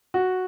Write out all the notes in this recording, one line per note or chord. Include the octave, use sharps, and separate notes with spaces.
F#4